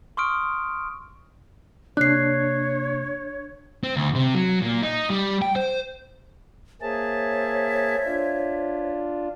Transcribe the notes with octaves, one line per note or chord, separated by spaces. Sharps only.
C6 C#6 D#6 F6 D7
C3 A#3 D4 C#5 F#6 C7
C4
D2
C3
F#3
A#2
D#4
G3
G5
C5
A#3 G#4 C5 C#5 E5 A5
D4 F4